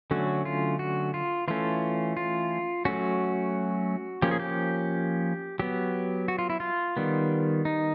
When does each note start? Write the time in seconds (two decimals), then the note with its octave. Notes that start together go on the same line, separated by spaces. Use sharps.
0.11 D3 F#3 A3 C#4 F#4
0.45 F4
0.79 F#4
1.14 F4
1.48 E3 A3 C#4 F4
2.17 F4
2.85 F#3 A3 C#4 F#4
4.22 F3 A#3 C#4 G4
4.31 G#4
4.40 G4
5.59 F#3 B3 G4
6.28 F#4
6.39 F4
6.50 E4
6.60 F4
6.97 D#3 G3 B3
7.65 D#4